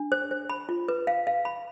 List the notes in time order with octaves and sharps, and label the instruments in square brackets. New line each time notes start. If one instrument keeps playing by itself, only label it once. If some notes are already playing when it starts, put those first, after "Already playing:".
Already playing: [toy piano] D4
C5
C5
B5
F4
B4
F5
F5
B5